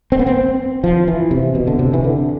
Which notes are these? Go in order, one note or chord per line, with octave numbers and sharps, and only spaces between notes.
C4
B3
C4
F3
E3
C3
B2
D3
C3
E3
D3